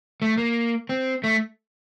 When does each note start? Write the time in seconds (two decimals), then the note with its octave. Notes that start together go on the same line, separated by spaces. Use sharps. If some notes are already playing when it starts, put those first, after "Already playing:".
0.22 A3
0.37 A#3
0.89 C4
1.24 A3